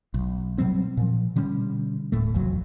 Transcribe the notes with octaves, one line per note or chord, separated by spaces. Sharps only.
B1
B2 F#3 G3 C4
A#2 F3
B2 D3 G3 C#4
D#1 A2 A3
E1 C2 F2 F#3